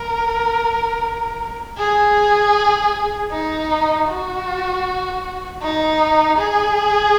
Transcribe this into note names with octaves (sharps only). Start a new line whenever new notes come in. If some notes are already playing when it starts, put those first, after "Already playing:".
Already playing: A#4
G#4
D#4
F#4
D#4
G#4